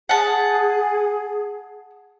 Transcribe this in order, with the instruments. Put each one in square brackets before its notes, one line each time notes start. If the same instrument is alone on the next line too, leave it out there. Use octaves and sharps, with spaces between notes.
[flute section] G#4 [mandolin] F#5 A5